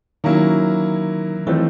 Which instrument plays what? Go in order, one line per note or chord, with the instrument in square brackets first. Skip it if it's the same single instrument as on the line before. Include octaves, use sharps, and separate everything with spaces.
[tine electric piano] D#3 [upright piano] F#3 A#3 C#4 E4
[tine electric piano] E3 [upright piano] F3 A3 C4 D#4